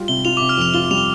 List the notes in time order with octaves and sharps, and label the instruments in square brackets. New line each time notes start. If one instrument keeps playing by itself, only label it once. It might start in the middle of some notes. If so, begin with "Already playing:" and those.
Already playing: [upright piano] G3 F4
[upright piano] C3 [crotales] G7
[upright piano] F4 [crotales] F7
[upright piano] C3 [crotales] D6
[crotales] F6
[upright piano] F2 [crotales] F7
[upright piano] F4 [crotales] G7
[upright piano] G3 [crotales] F7
[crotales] G7